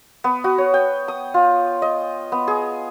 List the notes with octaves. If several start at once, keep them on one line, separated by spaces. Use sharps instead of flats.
B3
F#4
C#5
G5
D#6
F4
D#5
B3
G#4